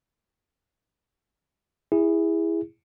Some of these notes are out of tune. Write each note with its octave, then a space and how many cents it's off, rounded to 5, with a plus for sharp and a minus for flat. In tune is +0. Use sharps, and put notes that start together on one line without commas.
E4 +0 G#4 -20